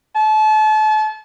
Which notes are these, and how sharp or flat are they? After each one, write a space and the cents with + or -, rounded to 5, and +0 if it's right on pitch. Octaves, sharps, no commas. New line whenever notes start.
A5 -35